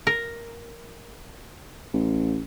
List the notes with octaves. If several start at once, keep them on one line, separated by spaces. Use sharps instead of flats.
A#4
A1